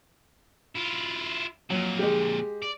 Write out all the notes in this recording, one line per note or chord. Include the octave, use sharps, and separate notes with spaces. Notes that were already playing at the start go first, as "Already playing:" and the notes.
E4 F4
F2 A#2 F#3
G#3 G4
D5